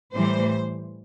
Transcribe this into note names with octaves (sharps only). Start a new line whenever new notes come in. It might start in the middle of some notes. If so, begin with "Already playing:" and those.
A2 E3 G3 C5